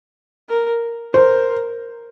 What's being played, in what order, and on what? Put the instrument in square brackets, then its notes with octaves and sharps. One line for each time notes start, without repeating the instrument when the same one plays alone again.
[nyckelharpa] A#4
[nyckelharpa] A#4 [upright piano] C5